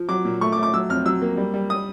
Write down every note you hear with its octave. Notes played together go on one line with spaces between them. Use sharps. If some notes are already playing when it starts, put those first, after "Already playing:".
Already playing: F3
F#3 D6
A#2
A3 C#6
D6
A3
D6
F#3 E6
F2 F6
F#3 E6
A#3
G3
G3
D#6